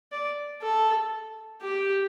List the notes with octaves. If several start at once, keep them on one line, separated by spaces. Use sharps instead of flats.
D5
A4
G4